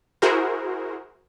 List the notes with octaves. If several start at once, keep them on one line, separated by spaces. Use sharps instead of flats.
E4 F#4 G#4 A#4 C5